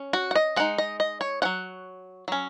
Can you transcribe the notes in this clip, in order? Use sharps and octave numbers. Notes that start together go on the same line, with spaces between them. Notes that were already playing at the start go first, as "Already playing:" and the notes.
Already playing: C#4
F#4
F#5
D#5
G#3 D#4 F#5
D#5
D#5
C#5
F#3 C#4 F#5
F#3 C#4